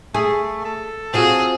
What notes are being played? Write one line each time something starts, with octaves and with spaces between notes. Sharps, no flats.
A3 G#4
A4
C4 F4 F#4 G#4